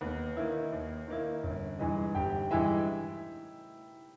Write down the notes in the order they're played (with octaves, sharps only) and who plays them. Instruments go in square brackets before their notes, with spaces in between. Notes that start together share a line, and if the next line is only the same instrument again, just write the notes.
[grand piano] D#2 [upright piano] B3 B4
[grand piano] D#3 A#3 E4
D#2
D#3 A#3 E4
[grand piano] G1 [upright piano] C#4 C#5
[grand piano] G2 E3 G#3 [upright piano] D#4 D#5
[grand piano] G1 [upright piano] G4 G5
[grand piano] G2 E3 G#3 [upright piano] E4 E5